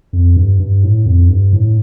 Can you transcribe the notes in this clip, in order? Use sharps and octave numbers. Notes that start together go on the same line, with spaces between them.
F2
G2
G2
A2
F2
G2
A2